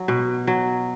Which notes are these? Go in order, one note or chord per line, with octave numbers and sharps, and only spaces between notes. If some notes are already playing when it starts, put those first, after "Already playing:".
Already playing: F#3
B2
F#3